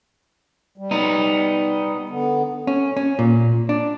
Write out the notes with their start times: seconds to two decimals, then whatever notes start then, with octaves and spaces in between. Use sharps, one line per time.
0.78 G3
0.91 B3 D#4
2.09 D3 B3
2.67 C#4
2.97 C#4
3.19 A#2
3.69 D4